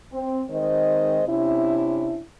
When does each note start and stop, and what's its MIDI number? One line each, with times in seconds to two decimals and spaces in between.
0.12 0.42 60
0.49 1.22 51
0.49 1.22 56
0.49 1.22 60
0.49 1.22 72
0.49 1.22 75
1.27 2.20 48
1.27 2.20 61
1.27 2.20 62
1.27 2.20 64